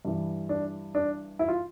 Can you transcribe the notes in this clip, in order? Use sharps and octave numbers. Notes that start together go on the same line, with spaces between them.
G2 E3
D4
D4
E4
F4